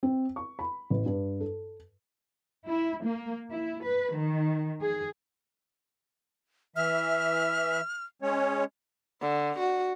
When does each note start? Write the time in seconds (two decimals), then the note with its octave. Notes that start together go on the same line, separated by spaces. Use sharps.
0.03 C4
0.36 C#6
0.59 B5
0.90 A1
1.06 G2
1.40 A4
2.69 E4
3.05 A#3
3.50 E4
3.83 B4
4.15 D#3
4.82 G#4
6.76 E3 E5 F6
8.22 G#3 C#4 C#5
9.22 D3
9.59 F#4